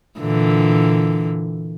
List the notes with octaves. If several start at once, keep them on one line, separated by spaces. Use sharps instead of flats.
A#2 D3 E3